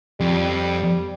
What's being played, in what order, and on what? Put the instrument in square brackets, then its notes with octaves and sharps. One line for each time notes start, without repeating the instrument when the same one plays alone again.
[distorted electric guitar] F2 [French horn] G3